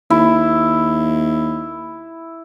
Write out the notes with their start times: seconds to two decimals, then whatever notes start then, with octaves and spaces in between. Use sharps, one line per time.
0.10 D#2 E4